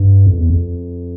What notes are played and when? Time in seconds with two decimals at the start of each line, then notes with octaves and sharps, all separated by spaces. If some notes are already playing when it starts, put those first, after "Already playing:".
Already playing: G2
0.26 F2
0.38 E2
0.50 F2